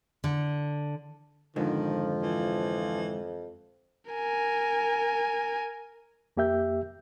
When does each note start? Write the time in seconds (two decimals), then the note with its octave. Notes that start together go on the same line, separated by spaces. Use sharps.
0.24 D3
1.56 F2 G#2 D3 D#3 F3
2.22 E3
4.11 A#4 G#5
6.37 F2 A#3 G4 E5 G6